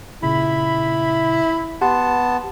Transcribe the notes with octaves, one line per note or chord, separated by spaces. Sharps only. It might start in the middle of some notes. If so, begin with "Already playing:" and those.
A#2 C#3 E4 B5
B3 G4 F#5 A5 C6